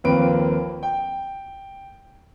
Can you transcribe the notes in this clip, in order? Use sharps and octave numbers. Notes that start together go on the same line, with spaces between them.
D#2 F3 A#3 C4 B4 D7
G5